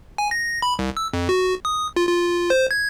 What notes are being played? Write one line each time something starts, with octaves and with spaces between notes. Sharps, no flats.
G#5
A#6
B5
C2
E6
F2
F#4
D#6
F4
F4
C5
G#6